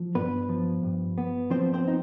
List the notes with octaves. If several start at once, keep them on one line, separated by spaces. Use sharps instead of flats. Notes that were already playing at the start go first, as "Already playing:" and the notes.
Already playing: F3
G2 B3 B4
F3
G2
B3
F3 C4 C5
C4 C5
D#4